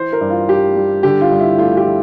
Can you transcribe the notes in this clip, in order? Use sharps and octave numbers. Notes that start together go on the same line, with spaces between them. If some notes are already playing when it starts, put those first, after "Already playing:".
Already playing: E3 C5
A#4
G2
F4
G2 G4
G3
D3 G4
F4
G2
E4
A3 F4
G4
F3